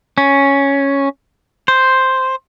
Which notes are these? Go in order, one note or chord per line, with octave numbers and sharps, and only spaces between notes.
C#4
C5